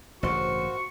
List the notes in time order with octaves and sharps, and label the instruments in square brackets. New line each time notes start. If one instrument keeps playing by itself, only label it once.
[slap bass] A1 G2 C#3 [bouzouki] A#3 C5 [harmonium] F#4 [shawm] C#6